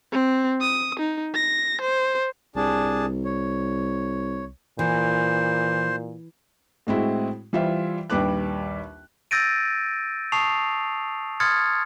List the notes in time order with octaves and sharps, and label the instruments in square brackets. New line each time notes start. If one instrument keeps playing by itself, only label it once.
[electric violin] C4
D#6
D#4
A#6
C5
[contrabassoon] C2 [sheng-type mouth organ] D4 G#4 A5
[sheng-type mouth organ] C#5
[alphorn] A#2 [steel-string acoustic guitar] E3 [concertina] C5
[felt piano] A2 G#3 C4 E4 F#4
E3 G3 F4 C5 E5
A#1 D#2 G3 B4 D6 F#6
[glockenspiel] E6 G6 A6 A#6 D7 D#7
A5 C#6 D#6 C7 F7
C6 D#6 F6 G#6 A6 C#7